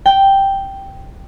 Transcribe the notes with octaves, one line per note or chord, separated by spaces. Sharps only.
G5